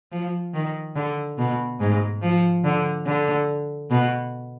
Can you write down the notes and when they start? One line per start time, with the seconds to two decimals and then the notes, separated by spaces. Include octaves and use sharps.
0.12 F3
0.54 D#3
0.96 D3
1.38 B2
1.80 G#2
2.22 F3
2.64 D3
3.06 D3
3.91 B2